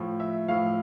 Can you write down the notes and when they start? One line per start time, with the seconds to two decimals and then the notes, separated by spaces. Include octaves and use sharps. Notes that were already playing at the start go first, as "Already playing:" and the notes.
Already playing: A2 F3
0.20 E5
0.48 A2 F3 F5